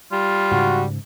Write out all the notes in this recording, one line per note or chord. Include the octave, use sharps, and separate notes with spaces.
G3 F4
G#2 C#3 F#4